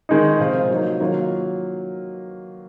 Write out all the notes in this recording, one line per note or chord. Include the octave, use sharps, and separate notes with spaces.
D#3 G#3 D#4
C3 F3 C4 F4
F#3 A#3 D#4
D#3 F#3 A#3 F4